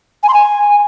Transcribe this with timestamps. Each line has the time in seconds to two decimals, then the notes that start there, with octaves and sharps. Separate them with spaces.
0.23 G#5
0.28 C6
0.34 G#5